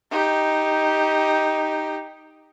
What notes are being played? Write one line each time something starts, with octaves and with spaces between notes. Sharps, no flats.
D#4 G4